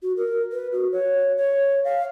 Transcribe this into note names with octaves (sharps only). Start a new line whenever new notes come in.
F#4
A#4
B4
F#4
C#5
C#5
F5